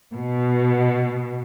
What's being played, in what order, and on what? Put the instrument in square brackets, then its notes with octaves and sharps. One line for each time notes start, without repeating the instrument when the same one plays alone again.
[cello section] B2